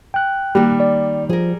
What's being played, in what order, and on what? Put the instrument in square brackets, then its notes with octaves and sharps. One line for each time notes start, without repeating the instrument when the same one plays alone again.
[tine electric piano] G5 F#6
[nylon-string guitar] D#3 A#3 [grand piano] G3
[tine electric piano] D5
[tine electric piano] F3 [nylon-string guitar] G#4 A#4